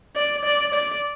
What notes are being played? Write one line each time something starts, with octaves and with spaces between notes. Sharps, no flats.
D5
D5
D5